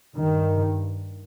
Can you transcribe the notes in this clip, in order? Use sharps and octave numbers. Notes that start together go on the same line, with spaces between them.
G2 D#3